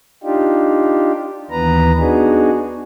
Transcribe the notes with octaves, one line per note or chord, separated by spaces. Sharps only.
D4 D#4 F4 G4
D#2 E3 B3 B4 A#5
B3 D4 D#4 F#4 G#4